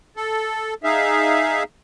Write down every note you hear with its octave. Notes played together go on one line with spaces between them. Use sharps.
A4
D#4 G#4 E5 F5